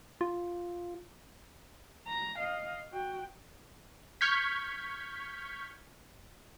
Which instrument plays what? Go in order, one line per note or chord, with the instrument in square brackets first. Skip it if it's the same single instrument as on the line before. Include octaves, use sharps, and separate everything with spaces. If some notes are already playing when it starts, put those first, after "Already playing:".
[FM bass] F4
[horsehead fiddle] A#5
D#5 F5
F#4 G5
[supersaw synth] C#6 F6 G6 G#6 B6